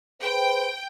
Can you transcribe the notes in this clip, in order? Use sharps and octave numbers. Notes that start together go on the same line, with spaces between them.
G#4 B4 C5 G5